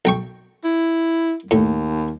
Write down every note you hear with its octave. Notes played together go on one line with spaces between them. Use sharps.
B1 G5 C#6
E4
D#2 A2